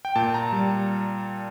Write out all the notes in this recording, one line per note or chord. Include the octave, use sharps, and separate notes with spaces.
G5
A#2 A5
A#5
G3